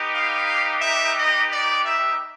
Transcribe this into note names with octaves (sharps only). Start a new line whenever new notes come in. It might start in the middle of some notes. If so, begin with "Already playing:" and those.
Already playing: B3 D#4 G4
F5
E5
D#5
D5
E5